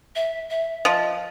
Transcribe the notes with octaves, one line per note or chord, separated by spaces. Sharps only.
E5
E5
F3 D#5